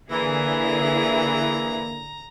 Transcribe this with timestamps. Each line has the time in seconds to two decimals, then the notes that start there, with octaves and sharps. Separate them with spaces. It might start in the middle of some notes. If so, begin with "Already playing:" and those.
0.11 D3 E3 A#3 E4 G#4 A#5